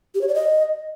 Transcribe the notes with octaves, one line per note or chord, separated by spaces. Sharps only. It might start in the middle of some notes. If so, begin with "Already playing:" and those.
G4
C#5
D5
D#5